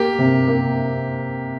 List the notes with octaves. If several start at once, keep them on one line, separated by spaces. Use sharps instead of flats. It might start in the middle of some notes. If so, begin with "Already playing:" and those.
Already playing: A#3 G4
C3
A#3